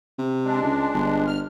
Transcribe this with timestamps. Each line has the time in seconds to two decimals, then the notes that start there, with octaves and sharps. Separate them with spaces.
0.19 C3
0.45 G#3 D4
0.63 C#2
0.94 G1
1.27 F6